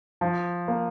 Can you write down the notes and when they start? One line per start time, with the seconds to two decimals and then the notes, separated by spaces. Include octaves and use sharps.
0.21 F3
0.68 A#3